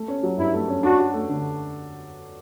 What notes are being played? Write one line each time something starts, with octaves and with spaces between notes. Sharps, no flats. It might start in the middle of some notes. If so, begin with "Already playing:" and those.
Already playing: A3
C#4
F#3
G2 E4
A3
C#4
D4 F#4
F#4
A3
D3